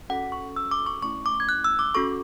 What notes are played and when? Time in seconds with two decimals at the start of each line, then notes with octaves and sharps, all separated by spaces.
0.09 C#4 F#4 A4 F#5
0.32 C#6
0.56 E6
0.71 D6
0.86 C#6
1.02 A3 C#4 E4 C#6
1.26 D6
1.40 G#6
1.49 F#6
1.64 E6
1.79 D6
1.95 C#4 F#4 A4 C#6